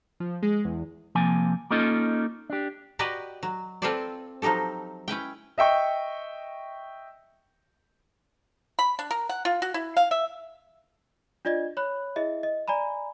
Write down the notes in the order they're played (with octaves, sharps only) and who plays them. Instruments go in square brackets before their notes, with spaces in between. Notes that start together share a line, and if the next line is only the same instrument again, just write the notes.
[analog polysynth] F3
G#3
E2
[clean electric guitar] C3 F3 A#3 G#5
A#3 C#4 D#4 F4 A4 D#5
D4 G4
[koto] F#4 G4 B4 D5 D#5 F#5
F#3
C4 F4 A4 B4 C5 D5
F3 F#3 D#4 G4 A4
C#4 E4 B4 G5
[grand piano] D#5 E5 G5 C#6
[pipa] B5
D4
A#4
F#5
F4
F#4
E4
F5
E5
[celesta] D4 F4 D5 D#5 G#6
C#5 B5 F#6
E4 G#4 D#5 E5
D#5
D5 G#5 A#5 B5